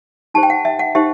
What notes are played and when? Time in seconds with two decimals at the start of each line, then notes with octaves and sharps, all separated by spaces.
0.34 D#4 G4 C5 A5
0.43 G5
0.50 F#5
0.65 E5
0.79 F#5
0.95 D#4 G4 C5 E5